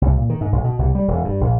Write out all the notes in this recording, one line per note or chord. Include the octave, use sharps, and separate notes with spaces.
C2
A#2
D#3
G#2
B1
B2
C2
G3
E1
G2
A#1